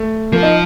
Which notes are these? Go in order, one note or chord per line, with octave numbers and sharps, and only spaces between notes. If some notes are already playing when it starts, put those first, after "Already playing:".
Already playing: A3
F3 A#3
D#4